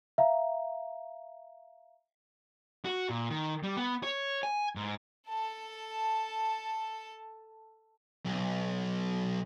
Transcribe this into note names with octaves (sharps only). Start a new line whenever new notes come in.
E5 F5 A#5
F#4
A#2
D#3
G3
B3
C#5
G#5
G#2
A4 A5
B1